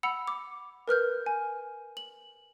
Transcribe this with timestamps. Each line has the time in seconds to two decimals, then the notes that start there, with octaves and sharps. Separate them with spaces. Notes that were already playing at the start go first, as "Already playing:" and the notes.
0.03 F#5 B5 E6 C#7 F7
0.27 D6
0.88 A#4 B4 F6 G6
1.26 G#5
1.97 F#7